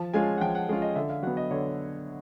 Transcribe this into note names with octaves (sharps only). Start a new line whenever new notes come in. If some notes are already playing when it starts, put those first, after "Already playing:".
Already playing: F3 A5
G#3 C#4 F4 G#5
F#5
F3 G5
F#5
G#3 C#4 F4
D#5
D3 E5
F5
F#3 B3 F#5
D#5
D3 C#5